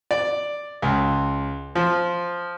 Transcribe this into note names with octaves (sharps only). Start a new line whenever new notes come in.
D5
C#2
F3